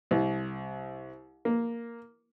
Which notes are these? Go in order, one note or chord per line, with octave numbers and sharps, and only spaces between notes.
C2
A#3